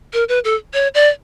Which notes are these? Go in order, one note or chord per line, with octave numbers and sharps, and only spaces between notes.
A#4
B4
A4
C#5
D5